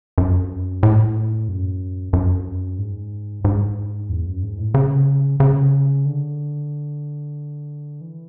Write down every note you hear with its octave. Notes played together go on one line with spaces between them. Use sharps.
F#2
A2
F#2
F#2
G#2
G#2
E2
F#2
G#2
A2
C#3
C#3
D3
E3